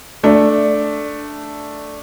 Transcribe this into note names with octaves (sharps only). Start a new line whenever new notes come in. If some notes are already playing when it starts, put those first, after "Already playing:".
A3 D4